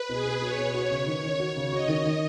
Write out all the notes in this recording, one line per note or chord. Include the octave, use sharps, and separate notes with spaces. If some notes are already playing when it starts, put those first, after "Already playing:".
Already playing: B4
B2 G#4
B2
F#4 C#5
B2
F#4
C#3
D#3
D#3
F#4 C#5
C#3
F#4 D#5
D#3
D#3